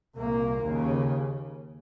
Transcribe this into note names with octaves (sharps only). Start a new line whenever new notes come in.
C2 A#2 A#3
D#2 C#3